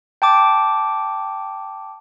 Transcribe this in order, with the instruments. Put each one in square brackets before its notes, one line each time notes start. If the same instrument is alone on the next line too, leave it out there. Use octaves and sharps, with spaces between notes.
[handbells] G5 A5 D6